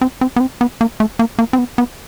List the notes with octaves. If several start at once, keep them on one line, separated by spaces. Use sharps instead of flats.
C4
C4
B3
C4
B3
A#3
A3
A#3
A#3
C4
B3
B3